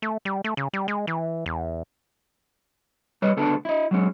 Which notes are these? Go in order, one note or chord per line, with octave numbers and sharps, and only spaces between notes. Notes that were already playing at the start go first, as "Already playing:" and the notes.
A3
G3
A3
C#3
G3
G#3
E3
E2
G3 B4 C#5 D#5
C#2 D3 A3 B3 D4 A5
E4 D#5
F#3 G#3 C#4